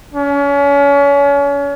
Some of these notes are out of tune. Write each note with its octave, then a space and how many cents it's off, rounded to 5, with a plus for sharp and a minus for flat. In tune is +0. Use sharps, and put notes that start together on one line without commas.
C#4 +35